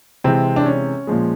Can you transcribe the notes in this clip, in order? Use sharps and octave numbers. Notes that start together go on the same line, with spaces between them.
C3 E3 G#3 C4
D4
C#4
A#2 F3 G#3